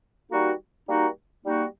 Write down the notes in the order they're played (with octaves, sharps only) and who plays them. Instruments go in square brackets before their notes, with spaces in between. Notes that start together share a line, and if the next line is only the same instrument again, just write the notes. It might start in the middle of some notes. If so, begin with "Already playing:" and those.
[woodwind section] G3 A#3 D#4 F#4
G3 A#3 D#4 F#4
G3 A#3 D#4 F#4